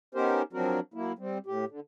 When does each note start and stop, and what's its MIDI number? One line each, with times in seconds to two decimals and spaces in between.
0.15 0.42 59
0.15 0.42 61
0.15 0.42 63
0.15 0.42 67
0.15 0.42 70
0.15 0.42 72
0.53 0.80 53
0.53 0.80 54
0.53 0.80 60
0.53 0.80 62
0.53 0.80 66
0.53 0.80 70
0.94 1.13 54
0.94 1.13 58
0.94 1.13 64
1.19 1.38 55
1.19 1.38 60
1.46 1.65 45
1.46 1.65 67
1.68 1.80 50